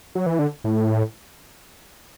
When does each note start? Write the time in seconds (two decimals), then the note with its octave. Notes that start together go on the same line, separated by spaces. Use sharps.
0.15 F#3
0.26 E3
0.39 D3
0.64 A2